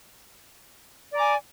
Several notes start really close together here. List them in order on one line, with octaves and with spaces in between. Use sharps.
D5 A#5 D6 G#5